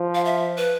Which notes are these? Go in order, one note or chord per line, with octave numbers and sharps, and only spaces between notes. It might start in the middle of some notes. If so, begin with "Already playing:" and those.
Already playing: F3
F5
E5
B4